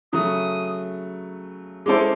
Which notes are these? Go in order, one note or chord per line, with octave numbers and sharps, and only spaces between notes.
C#3 F#3 A3 D#6
G#3 C#4 E4 A4 C5 D6